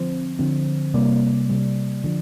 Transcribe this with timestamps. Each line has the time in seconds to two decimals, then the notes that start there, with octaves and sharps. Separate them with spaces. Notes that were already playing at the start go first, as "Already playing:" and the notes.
Already playing: D3 F3 C4 C5
0.39 D3 F3 C4
0.94 C3 G3 A#3 D5
1.49 C3 G3 A#3
2.04 D3 F3